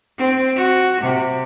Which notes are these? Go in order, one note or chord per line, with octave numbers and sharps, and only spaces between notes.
C4
F#4
C3